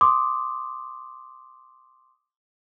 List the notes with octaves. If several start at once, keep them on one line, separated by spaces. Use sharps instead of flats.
C6 D6 D#6